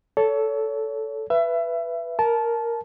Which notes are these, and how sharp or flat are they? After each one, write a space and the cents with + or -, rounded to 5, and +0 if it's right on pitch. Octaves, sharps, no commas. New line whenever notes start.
A4 +0 C#5 +30
B4 +0 E5 +25
A#4 +0 A5 -20